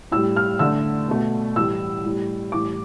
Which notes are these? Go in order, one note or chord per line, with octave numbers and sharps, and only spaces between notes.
A2 G3 E6
F6
D3 A3 E6
B2 A3
A2 E3 G3 E6
A2 G3
A2 E3 G3 D6